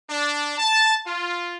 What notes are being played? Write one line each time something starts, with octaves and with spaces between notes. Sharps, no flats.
D4
A5
F4